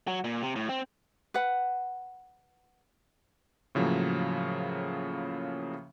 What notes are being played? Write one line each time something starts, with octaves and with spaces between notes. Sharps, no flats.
F#3
A#2
C3
A2
C4
B4 F#5
A2 C#3 F3 F#3 A#3